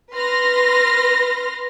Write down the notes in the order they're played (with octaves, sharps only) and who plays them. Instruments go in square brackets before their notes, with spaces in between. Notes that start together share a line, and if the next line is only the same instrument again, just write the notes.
[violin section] B4 C6 F6 A#6